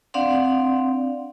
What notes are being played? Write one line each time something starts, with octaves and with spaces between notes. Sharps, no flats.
C4 D4 D5 F5 F#5 C6